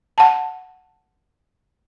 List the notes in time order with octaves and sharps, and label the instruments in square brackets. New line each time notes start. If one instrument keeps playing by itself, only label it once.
[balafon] F#5 A5